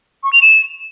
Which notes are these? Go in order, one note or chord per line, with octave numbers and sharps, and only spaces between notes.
C#6
F7
E7